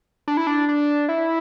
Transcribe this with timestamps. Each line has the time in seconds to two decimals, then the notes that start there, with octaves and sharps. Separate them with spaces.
0.28 D4
0.37 E4
0.47 D4
0.69 D4
1.09 E4